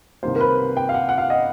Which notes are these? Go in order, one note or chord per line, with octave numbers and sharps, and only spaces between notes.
C2 C3 D#3 G3 A#3 C5
A#4
B4
G5
F5
F#5
F#5
F5
D#5